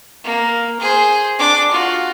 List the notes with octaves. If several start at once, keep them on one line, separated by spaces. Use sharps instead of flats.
A#3
G#4 C5
D4 D6
F4 F#4